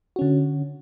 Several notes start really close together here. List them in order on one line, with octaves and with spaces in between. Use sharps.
F#4 C#4 D3